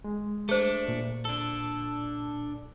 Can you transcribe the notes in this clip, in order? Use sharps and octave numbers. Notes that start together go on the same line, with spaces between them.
G#3
A3 D4 G#4 C5
A#2
D4 A4